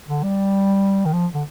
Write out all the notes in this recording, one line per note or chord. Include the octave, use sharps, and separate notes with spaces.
D3
G3
D#3
F3
D3